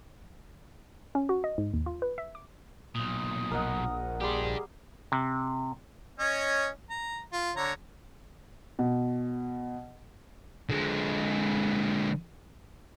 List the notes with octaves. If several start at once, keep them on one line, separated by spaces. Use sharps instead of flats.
C#4
F#4
D#5
G#2
D#2
F4
B4
E5
D6
B1 A#2 D#6
A#1 A#4 D#5 F#5
G3 D4 G4 G#4 C6
C3
C#4 C#5 D#5
A#5
F4
D3 C#5 A#5
B2
D3 G#3